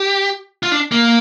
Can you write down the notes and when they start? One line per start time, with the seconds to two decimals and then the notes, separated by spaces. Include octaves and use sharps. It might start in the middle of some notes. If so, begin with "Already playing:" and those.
Already playing: G4
0.63 F4
0.72 D4
0.92 A#3